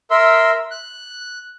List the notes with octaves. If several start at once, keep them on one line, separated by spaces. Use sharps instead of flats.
A#4 E5 C6 E6
F#6